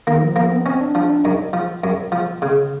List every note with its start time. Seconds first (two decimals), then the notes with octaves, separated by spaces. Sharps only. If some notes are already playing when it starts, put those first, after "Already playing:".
0.07 D#3 A#3
0.22 F3
0.36 F3 A#3
0.52 B3
0.66 C4 C#4
0.81 D4
0.95 F3 D4
1.10 D4
1.24 F#2 D#4
1.53 F3
1.84 F#2
2.12 F3
2.42 C#3